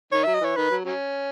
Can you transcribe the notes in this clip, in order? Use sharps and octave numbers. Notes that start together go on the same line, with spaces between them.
D#3 C#5
F#3 E5
D#5
E3 C#5
D#3 B4
F#3
F#3 C#4